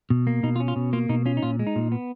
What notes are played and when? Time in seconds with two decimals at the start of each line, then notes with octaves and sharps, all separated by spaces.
0.10 B2
0.27 A#3
0.43 B2 D#4
0.56 F4
0.60 C#4
0.68 F4
0.76 B2
0.93 A#3 F4
1.09 B2 D#4
1.26 C#4 F4
1.37 D#4
1.43 A#2 F4
1.59 G#3
1.67 D#4
1.76 A#2
1.92 B3